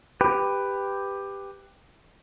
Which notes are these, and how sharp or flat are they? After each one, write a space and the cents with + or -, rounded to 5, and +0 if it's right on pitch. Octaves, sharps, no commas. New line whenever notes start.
G4 +10 B4 +10